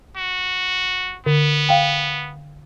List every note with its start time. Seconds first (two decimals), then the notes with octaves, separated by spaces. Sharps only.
0.16 F#4
1.26 D3 B3
1.69 F5 G5